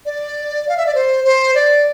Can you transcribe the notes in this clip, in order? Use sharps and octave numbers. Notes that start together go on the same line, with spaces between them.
D5
F5
E5
D5
C5
C5
D5